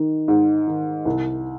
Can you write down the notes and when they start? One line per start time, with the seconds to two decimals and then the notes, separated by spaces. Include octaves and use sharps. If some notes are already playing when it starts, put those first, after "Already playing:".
Already playing: D#3
0.28 G#2
0.68 D#3
1.05 C2